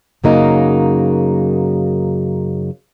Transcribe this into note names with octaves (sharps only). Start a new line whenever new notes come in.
F#2 C#3 F#3 A#3 D#4